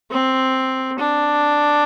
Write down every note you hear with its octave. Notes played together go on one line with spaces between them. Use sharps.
C4
D4